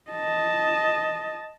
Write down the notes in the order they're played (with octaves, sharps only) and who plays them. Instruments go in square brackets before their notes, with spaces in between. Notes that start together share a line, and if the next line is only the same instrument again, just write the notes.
[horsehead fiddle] D#5 A5